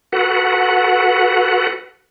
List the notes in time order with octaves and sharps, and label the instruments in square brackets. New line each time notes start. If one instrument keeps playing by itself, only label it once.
[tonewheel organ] F#4 A4 B4 F#5